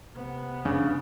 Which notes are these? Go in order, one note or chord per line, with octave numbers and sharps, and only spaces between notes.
C3 B3
C#3 D4